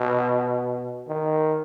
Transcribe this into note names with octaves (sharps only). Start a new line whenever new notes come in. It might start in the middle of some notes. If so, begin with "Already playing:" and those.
Already playing: B2
D#3